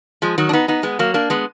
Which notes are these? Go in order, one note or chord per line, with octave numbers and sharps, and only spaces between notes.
F3 G#3
D#3 F#3
D4
B3 D#4
B3 D#4
G#3 B3
F#3 A#3
A#3 D4
G#3 B3